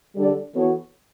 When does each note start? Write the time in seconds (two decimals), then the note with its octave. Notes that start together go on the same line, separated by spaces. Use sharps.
0.16 D3 G3 D4 A4 D5
0.54 E3 B3 F#4 A4 C#5